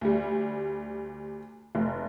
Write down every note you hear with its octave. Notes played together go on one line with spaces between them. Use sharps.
D2 G3
F1